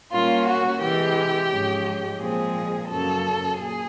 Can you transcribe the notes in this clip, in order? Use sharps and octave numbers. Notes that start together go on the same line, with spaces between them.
A#2 G3 A#3 C#4 F4
F#4
C3 E3 G#3 G4
G#2 F3 G#3 C#4
A#2 F3 G#3 C4 G#4
F#2 C#3 F#3 A#3 A4
A#2 G#4